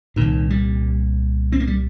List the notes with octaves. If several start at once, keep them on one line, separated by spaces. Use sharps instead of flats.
C2 A#2 D#3
G3
C4
A#3
G3